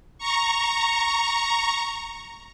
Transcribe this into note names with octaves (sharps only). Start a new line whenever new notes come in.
A#5 C#6